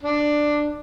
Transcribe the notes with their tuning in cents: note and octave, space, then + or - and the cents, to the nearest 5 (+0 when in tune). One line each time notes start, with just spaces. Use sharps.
D4 +10